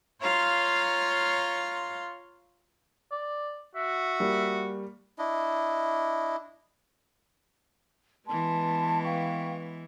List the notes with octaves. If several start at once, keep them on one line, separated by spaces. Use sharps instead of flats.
F4 C#5 F5 A#5 C6
D5
F#4 E5
G3 A#3
D4 E4 D#5
E3 G#3 B3 A5 C6
F5 G5 C#6